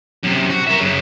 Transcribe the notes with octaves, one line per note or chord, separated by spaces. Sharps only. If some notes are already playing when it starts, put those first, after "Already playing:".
F#2 C3
F#4
A#4 E5
F#2 C#3